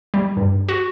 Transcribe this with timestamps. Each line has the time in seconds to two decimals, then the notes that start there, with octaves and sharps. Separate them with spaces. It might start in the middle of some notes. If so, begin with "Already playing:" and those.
0.14 G3
0.37 G2
0.69 F#4